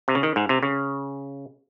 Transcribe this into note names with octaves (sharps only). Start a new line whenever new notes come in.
C3
C#3
D#3
G#2
C3
C#3